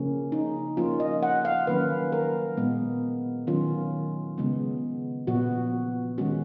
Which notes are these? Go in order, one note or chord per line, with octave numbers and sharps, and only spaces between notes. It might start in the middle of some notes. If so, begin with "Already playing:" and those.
Already playing: C#3 F3 A#3 C#4
D#4
F3 A#3 C#4 F4
D#5
F#5
F5
D#3 F#3 A#3 C#4 B4
A#4
A#2 G#3 B3
D#3 F#3 C#4 F4
C#3 G#3 B3
A#2 F3 B3 F#4
D#3 G#3 C#4 F#4